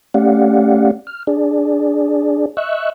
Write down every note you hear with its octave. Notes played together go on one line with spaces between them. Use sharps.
A3 C#4 G4 D5 F5 F#5
F6
D4 G#4 D5
D#5 E5 C#6 E6 F#6